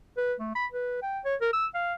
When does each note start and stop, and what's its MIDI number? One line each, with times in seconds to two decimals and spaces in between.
0.17 0.34 71
0.40 0.50 57
0.55 0.66 83
0.72 0.98 71
1.03 1.20 79
1.25 1.36 73
1.41 1.48 70
1.53 1.67 88
1.75 1.94 77